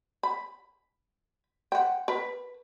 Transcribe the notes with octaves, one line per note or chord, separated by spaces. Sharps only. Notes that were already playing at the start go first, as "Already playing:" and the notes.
B5
F#5 G5
A#4 B4